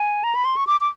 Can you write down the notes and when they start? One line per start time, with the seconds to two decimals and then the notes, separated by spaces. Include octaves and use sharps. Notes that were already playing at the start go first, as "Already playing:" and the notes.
Already playing: G#5
0.24 A#5
0.35 B5
0.45 C6
0.57 C#6
0.67 D6
0.81 D6